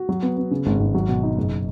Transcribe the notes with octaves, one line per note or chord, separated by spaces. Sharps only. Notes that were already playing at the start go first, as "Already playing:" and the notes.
Already playing: F#4
F#3
B3
B3
C#3
G#1
G#1
F#3
B2
D#4
F#1